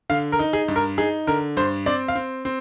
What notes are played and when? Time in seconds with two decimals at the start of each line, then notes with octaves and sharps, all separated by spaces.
0.10 D3 F5
0.32 A#4
0.39 D#4
0.53 G#4
0.68 G2
0.76 A#4
0.98 D#4 G#4
1.27 D3 A#4
1.57 G2 C5
1.86 C4 D5
2.08 F5
2.15 C4
2.45 C4